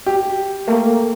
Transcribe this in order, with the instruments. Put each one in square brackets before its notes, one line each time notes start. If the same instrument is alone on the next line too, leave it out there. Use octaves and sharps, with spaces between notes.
[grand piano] G4
[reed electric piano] A3 A#3